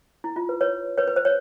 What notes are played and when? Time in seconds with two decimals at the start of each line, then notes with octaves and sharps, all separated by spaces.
0.24 E4
0.36 F4
0.49 B4
0.61 B4 C#5
0.97 B4 C#5
1.08 B4
1.16 C5
1.25 C#5